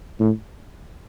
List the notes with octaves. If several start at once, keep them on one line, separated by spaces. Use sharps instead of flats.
A2